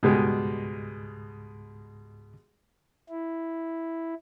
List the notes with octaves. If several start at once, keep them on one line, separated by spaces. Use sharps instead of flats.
C#2 G#2 B2 G3 G#3
E4